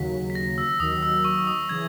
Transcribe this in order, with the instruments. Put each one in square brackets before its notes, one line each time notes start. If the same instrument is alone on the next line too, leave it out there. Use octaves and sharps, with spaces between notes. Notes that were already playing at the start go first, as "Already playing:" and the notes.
Already playing: [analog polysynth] D#2 C#3 F#3 [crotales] B6
[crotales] B6
A#6
E6
[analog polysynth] D#2 D#3 F#3 [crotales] D#6
[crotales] E6
C#6
D#6
[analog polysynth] C#3 E3 [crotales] G#6